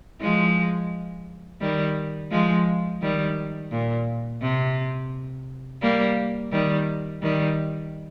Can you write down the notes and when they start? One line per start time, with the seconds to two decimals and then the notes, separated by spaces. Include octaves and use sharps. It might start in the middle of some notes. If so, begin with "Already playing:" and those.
0.20 F3 G#3
1.61 D#3 G3
2.31 F3 G#3
3.02 D#3 G3
3.71 A#2
4.42 C3
5.82 G3 A#3
6.52 D#3 G3
7.22 D#3 G3